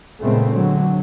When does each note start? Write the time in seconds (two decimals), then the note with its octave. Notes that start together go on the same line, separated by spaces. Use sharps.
0.19 A#2 C#3 G#3 A3 B3 C4
0.51 D3 F#3